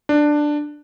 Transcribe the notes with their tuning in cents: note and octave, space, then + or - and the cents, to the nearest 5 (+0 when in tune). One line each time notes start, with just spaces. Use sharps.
D4 +10